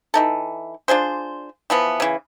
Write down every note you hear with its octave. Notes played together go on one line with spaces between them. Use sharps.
E3 D#4 A4
D4 F4 G#4 C5
E3 F3 B3
C#3 E3